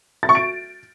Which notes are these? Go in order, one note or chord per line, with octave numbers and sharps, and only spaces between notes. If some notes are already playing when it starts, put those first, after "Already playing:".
A6
C#6
D7